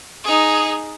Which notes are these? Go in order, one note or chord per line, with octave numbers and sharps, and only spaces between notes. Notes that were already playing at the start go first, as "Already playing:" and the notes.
D#4 G#4